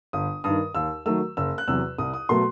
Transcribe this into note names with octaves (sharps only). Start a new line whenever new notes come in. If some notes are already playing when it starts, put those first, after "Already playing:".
G1 D#6
G2 D#3 D#6
D#2 E6
D#3 F#3 A3 E6
F#1 E6
F#6
E2 C3 F#3 E6
C2 D#6
D#6
B2 F#3 A3 C6